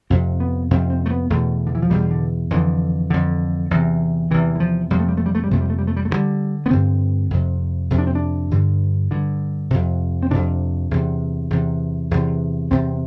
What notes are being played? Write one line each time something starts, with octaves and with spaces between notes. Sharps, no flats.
F2 C3 C4
B3
F2 C3 C4
C4
A3
B3
E2 B2 A3
D3
E3
F3
E2 B2 G3
D3
F2 D3 E3
F2 D3
E2 C3
E2 C3 E3
E3
F3
F2 C3 G3
A3
G3
A3
G3
A3
G3
F2 C3 A3
G3
A3
G3
A3
G3
A3
G2 D3 G3
B3
G2 D3 C4
F2 C3
F2 C3
D4
C4
D4
G2 D3
G2 D3
F2 C3
C4
F2 C3 D4
E2 C3
E2 C3
E2 C3
E2 C3 C4